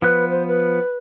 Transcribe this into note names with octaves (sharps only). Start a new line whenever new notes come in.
F3 B3 B4 F#6
C5
B4